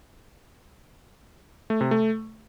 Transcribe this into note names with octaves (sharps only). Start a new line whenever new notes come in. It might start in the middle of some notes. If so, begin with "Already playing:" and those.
A3
C3
A3